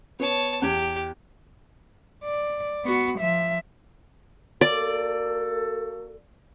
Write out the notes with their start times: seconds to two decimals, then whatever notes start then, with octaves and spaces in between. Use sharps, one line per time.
0.20 B3 C#5 A5
0.62 E2 G4 G#6
2.24 D5
2.85 B3 F#4
3.19 F3 E5
4.61 A#3 F#4 A4 D5